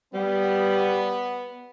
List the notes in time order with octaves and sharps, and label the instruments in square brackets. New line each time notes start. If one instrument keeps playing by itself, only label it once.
[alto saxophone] G3 [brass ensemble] B3